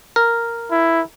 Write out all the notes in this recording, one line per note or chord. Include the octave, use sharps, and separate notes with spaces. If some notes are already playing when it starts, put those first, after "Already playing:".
A#4
E4